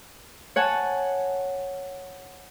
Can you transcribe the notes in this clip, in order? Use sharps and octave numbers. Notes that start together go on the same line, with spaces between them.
C#5 F#5 G#5 A5